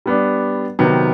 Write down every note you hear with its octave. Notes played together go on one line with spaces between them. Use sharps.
G3 B3 D4
C3 D#3 F#3 B3